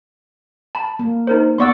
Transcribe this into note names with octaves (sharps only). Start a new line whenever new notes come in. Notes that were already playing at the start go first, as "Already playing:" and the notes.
A5 B5
A#3
D#4 A#4 C5
B3 D5 F#5 C6 C#6 E6